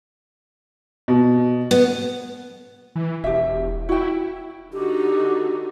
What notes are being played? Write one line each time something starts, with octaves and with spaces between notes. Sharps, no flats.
B2
B3
E3
E1 G4 E5
E4 F#4 G5
D3 D#4 F#4 G4